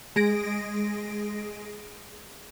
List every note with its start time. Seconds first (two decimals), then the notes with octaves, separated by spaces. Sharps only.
0.16 G#3 G#4 A#6 D7